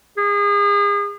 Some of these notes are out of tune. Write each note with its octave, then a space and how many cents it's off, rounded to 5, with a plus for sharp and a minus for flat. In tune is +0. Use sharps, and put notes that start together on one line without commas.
G#4 -35